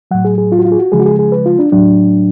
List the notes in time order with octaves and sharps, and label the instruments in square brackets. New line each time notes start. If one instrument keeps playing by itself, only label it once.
[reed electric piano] A2 F#3 F#5
G#4
G#4
F4
F#4
F4
G#4
F#4
C#3 F3 G#3 G#4
F#4
G#4
G#4
B4
F4
D4
A2 F#3 D4